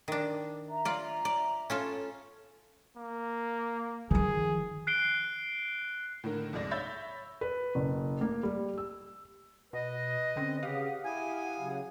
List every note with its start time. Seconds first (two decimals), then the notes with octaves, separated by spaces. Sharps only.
0.08 D#3 D4
0.69 E5 A#5
0.85 F4 D5
1.25 D5
1.70 C#4 F4 A4
2.97 A#3
4.11 D#3 F3 G#4
4.87 F#6 C7 D7 G7
6.24 A2 D3 D#3 A#4
6.53 C2 F2 G#2 D4 D5 A#6
6.71 C#5 E5 B5 E6 G6 A6
7.41 B4
7.75 F#1
8.21 A#3
8.43 G3
8.78 E6
9.73 B2 B4 D#5
10.36 D3 C4 C#4
10.63 C#3 G4 F5 F#5 D#6
11.04 E4 G4 G#5
11.59 C#3 F#3